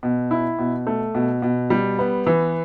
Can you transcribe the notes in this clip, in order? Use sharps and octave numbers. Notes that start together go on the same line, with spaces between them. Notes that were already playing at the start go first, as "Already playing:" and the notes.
B2
E4
B2
A3
B2
B2
G3
B3
E3